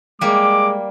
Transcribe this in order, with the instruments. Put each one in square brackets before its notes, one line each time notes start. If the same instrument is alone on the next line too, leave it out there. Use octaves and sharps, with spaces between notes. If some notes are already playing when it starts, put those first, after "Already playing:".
[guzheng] G3 A#3 [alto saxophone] G#3 [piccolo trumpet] D6